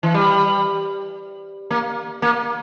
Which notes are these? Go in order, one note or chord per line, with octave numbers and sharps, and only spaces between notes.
E3
G3
A#3
A#3